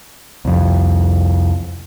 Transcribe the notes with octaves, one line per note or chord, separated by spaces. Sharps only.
C2 F2